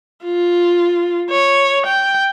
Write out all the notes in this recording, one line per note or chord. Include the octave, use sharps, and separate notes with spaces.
F4
C#5
G5